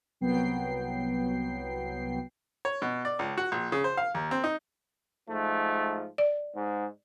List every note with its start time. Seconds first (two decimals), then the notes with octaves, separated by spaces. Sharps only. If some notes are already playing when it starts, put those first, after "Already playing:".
0.20 C2 F#3 B3 G5 C7
2.65 C#5
2.82 B2
3.05 D5
3.19 C#2
3.38 F#4
3.52 A#1
3.72 C#3
3.84 C5
3.97 F5
4.14 D#2
4.31 C4
4.44 D#4
5.30 G#2 F3 A3
6.18 D5
6.55 G#2